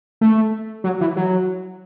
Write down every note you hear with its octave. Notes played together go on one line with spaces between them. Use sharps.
A3
F#3
E3
F#3